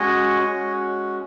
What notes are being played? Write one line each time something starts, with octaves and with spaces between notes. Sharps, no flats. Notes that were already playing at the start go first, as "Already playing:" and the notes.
Already playing: G#3 C#4 F#4 C#5 D#5
G#3 C#4 F#4